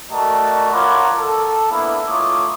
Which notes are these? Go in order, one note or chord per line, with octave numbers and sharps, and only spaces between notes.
A3 F#4 A#4 D5 D#5 A5
F4 A#4 C#5 F#5 B5 D6
A4
A#3 B3 D4 E4
A3 D#4 F4 C#5 D6 D#6